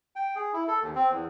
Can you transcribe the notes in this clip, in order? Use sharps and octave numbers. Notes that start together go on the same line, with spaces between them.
G5
G#4
E4
A4
D#2
C4
E2